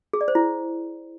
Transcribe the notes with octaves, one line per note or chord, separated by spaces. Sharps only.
G#4
D5
C5
E4